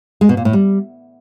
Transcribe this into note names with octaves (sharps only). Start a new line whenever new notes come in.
G#3
B2
A#2
A2
G3